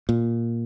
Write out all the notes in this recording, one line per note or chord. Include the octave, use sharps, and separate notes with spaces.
A#2